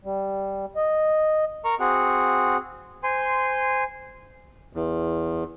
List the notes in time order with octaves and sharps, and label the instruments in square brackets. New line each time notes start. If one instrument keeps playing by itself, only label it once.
[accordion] G3
D#5
[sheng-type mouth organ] A#4 A#5 C#6
C4 F#4 G#4 F#5
C5 G#5 C6
[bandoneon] E2